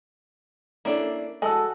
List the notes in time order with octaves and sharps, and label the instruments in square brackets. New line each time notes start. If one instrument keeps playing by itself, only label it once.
[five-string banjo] A#3 D4 A4 [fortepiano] C#4 E4 D5
[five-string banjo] G#3 [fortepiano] F#4 D#5 [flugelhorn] A4 [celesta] G#5 A5 E6